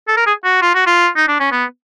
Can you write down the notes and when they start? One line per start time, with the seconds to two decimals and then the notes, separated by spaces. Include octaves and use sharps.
0.08 A4
0.17 A#4
0.26 G#4
0.44 F#4
0.62 F4
0.75 F#4
0.87 F4
1.16 D#4
1.28 D4
1.40 C#4
1.52 B3